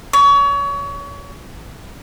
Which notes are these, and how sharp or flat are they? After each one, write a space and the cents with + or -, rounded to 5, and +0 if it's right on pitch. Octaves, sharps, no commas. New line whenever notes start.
C#5 +30